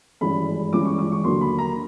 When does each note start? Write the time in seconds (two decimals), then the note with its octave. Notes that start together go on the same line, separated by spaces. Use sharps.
0.21 G#1 G2 E3 G#3 C#4 B5
0.73 G#1 G2 E3 G#3 C#4 D6
0.85 C#6
0.99 D6
1.12 C#6
1.24 D#2 D3 F#3 A#3 C6
1.41 B5
1.58 A#5